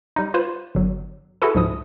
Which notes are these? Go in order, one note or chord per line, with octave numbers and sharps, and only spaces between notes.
G3 D#4
F4 B4 C5
G1 F#3
E4 F#4 G#4 A4 B4
C#2 G#2 F3 D#6